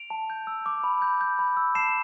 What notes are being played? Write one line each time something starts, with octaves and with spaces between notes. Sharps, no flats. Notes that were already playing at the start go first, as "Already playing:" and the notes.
Already playing: D7 F7
A5
G6
E6
D6
B5
G6
G6
B5
E6
A5 C7 E7